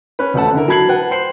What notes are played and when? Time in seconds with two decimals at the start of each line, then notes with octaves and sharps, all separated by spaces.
0.19 C#4 B4
0.34 D#1 E2 A3 F#5 A5
0.54 D3 E4 A#4
0.68 F#3 A5 B5 G#6 C7 F#7
0.89 B4 F#5 G5 A5
1.11 C5 C7 F#7